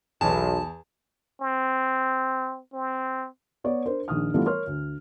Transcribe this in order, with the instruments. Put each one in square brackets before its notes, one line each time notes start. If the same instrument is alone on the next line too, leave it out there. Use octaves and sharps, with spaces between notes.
[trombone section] B1 [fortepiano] E2 [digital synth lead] A5
[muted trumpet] C4
C4
[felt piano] B3 C#5 D5
D4 A#4 C5
A#1 D#3 D#6 F6
E3 G3 A3 B3 F4
A#4 C#5 C6 F6
D2